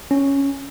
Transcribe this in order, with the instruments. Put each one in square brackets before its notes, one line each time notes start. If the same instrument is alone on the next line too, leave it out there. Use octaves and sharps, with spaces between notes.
[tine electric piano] C#4